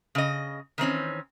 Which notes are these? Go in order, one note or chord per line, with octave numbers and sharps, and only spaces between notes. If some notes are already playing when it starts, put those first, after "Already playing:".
C#3 D#5
D#3 E3 C4 C#4